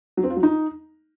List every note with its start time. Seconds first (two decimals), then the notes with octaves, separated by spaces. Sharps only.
0.17 F#3
0.24 C4
0.30 F4
0.37 F#3
0.43 D#4